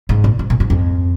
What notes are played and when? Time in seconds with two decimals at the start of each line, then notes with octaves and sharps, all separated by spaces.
0.09 G#2
0.24 A#2
0.39 G#2
0.50 A#2
0.60 G#2
0.70 F2